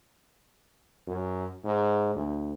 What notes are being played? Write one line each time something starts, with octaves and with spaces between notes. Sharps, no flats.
F#2
G#2
D2